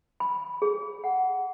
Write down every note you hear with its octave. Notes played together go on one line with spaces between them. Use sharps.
B5
G#4
F#5